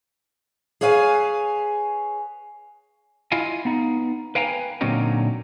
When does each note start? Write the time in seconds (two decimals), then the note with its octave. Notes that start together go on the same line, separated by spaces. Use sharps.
0.81 G#4 B4 C#5 F5 G#5
3.32 E4 F4 D#5 F5 G#5
3.65 B3 D#4
4.35 B4 F5 G5 G#5 A#5
4.81 A#2 D3 F#3 C4 C#4 D#4